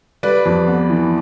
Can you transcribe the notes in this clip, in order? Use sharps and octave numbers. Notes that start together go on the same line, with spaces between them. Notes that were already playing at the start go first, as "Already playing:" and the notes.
G3 B4 D5
F2
B3
E3